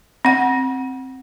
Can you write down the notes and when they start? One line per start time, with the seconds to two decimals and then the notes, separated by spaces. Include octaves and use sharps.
0.25 C4 F#5